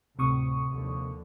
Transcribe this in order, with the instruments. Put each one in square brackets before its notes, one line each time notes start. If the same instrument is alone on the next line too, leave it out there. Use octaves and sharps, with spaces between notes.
[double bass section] D2 A2 [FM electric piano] C3 C#6 D#6
[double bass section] D#2 D3 F3